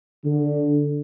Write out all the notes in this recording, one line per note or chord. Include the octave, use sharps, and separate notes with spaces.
D3